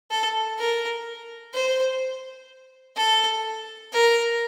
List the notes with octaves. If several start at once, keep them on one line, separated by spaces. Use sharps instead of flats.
A4
A#4
C5
A4
A#4